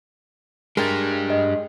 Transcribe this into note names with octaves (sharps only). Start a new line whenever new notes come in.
G#3 D4 G4 A#4 G5 A6
D#5